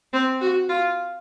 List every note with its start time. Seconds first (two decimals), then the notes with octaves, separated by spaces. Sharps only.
0.13 C4
0.41 F#4
0.69 F4